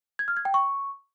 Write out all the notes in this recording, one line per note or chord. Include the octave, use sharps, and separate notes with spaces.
G#6
F6
G#6
G5
C#6